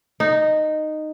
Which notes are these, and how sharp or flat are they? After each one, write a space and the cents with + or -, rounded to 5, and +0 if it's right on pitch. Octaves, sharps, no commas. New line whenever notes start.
D#4 -10